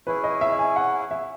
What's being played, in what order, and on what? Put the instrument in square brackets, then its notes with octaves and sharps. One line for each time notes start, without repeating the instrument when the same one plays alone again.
[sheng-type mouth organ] C#4 E4 G#4 [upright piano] B4
[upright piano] D#5
E5
G#5
F#5
E5